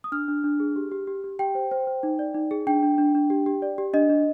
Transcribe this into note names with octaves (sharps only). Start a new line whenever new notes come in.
D#6
D4 F6
D4
D4
G#4
G4
G4
G4
G4
G4 G5
C5
C5
C5
D#4
D5
D#4
G#4
D4 G5
D4
D4
D4
G4
G4
D5
G4
D4 D#5
D4